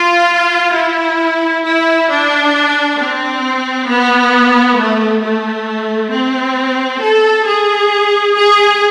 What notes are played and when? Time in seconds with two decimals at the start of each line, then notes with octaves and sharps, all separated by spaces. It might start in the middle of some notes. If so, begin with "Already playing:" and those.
Already playing: F4
0.74 E4
1.63 E4
2.08 D4
2.97 C4
3.87 B3
4.77 A3
5.21 A3
6.11 C4
7.00 A4
7.46 G#4
8.35 G#4